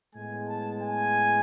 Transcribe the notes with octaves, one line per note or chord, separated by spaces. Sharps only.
A2 G#3 B3 G#5
A5
G#5